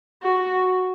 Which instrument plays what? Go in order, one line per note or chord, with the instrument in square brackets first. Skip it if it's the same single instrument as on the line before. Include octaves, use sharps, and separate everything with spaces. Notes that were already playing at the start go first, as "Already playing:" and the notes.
[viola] F#4